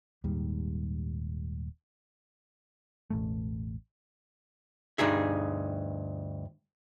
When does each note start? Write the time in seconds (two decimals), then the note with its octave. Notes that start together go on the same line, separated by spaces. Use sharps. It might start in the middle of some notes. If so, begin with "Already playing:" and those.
0.24 D#1 D#2 G#2 G3
3.10 E1 A1 A3
4.98 D2 G2 D#4 G#4 E5